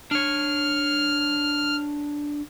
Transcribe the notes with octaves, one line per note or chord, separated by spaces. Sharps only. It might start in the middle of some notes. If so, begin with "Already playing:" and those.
D4 C#5 F6